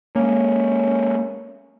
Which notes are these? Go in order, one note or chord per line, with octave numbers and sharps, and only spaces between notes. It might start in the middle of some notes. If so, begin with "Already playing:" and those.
G#3 A#3 C#4